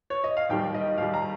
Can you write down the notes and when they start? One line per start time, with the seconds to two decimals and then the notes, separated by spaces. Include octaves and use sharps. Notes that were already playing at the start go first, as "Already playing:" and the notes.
0.10 C#5
0.24 D#5
0.37 F5
0.49 D#2 D#3 G3 G5
0.74 D#5
0.98 D#2 D#3 G3 F5
1.14 A#5